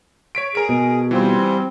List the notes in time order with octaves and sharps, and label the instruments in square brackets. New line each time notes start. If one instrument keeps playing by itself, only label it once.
[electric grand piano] C#5 B6 D7
[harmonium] G#4 [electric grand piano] A#4 D7
[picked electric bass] B2
[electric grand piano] E3 F4 C5 [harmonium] G3 C4